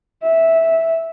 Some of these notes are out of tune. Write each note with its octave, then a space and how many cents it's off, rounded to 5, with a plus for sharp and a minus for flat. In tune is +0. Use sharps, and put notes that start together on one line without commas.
E5 -10